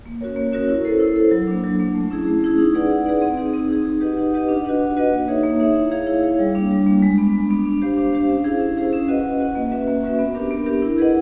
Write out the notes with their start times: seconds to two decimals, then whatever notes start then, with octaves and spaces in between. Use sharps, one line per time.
0.06 A#3
0.21 C#4 F#4 A#4 C#5
0.36 A#3
0.53 C#4 F#4 A#4 C#5
0.68 E4
0.85 A4 C5
1.00 E4
1.16 A4 C5
1.31 F#3
1.47 A#3 D4
1.64 F#3
1.80 A#3 D4
1.94 A3
2.10 C#4 E4 G#4
2.27 A3
2.42 C#4 E4 G#4
2.58 D#4
2.74 G#4 B4 D5 F#5
2.90 D#4
3.06 G#4 B4 D5 F#5
3.22 C4
3.38 D#4 G#4
3.53 C4
3.69 D#4 G#4
3.85 D#4
4.01 G4 B4 D#5 F#5
4.17 D#4
4.33 G4 B4 D#5 F#5
4.49 D4
4.65 F#4 B4 D#5 F#5
4.80 D4
4.96 F#4 B4 D#5 F#5
5.12 A#3
5.28 D#4 G#4 C#5 E5
5.43 A#3
5.60 D#4 G#4 C#5 E5
5.76 E4
5.91 G#4 C#5 F5
6.07 E4
6.23 G#4 C#5 F5
6.39 G3
6.55 A#3 D4
6.71 G3
6.86 A#3 D4
7.02 G#3
7.18 B3 D4
7.33 G#3
7.50 B3 D4
7.65 D4
7.82 G4 C5 F5
7.97 D4
8.13 G4 C5 F5
8.29 C#4
8.44 E4 G#4 C5 F5
8.60 C#4
8.77 E4 G#4 C5 F5
8.93 C#4
9.08 F#4 B4 D#5 F#5
9.24 C#4
9.40 F#4 B4 D#5 F#5
9.55 A#3
9.72 C#4 F#4 B4 E5
9.87 A#3
10.03 C#4 F#4 B4 E5
10.19 B3
10.35 D4 G4 A#4
10.51 B3
10.66 D4 G4 A#4
10.82 E4
10.98 G#4 B4 D#5 F#5